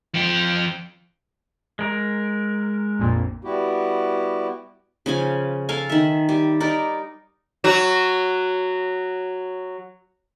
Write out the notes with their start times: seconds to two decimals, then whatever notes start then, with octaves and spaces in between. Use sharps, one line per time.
0.14 F3 G5
1.79 G#3 A#4
2.99 A#1 F2 A#2
3.43 G3 B3 E4 F#4 G4
5.06 C#3 F3 G#5
5.69 A4 A#4 F5 G#5
5.89 D#3 E5
6.29 G3
6.60 D#4 A#4 D5
7.64 F#3 F#4